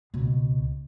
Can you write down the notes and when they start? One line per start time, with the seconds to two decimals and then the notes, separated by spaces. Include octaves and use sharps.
0.14 C#2 B2